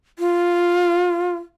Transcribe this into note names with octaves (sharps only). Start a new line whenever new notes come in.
F4